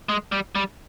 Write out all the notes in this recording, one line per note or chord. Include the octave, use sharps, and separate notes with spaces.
G#3
G3
G3